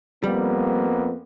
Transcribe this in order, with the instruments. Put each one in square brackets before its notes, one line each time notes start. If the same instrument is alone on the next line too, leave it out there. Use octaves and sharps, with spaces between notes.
[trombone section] F2 A#3 B3 [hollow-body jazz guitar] G3